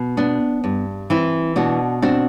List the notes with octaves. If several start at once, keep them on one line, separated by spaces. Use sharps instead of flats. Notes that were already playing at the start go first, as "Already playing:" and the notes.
Already playing: B2
B3 D4
G2
E3 C4 E4
B2 D4 F#4
C4 D4 F#4